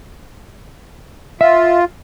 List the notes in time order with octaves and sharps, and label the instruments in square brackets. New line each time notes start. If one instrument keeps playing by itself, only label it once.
[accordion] F4 [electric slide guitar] E5